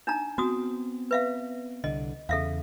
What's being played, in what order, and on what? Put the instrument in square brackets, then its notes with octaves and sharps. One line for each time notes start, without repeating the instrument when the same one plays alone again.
[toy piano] D4 D#4 A#5
[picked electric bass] B3 C4 [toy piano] F#4 D#6
[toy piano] B4 E5 F5
[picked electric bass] C2 D3 [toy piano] D#5
[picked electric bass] E2 C#3 [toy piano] A4 E5 F5